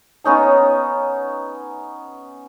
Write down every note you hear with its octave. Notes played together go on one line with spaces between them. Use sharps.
B3 C#4 D#4 A#5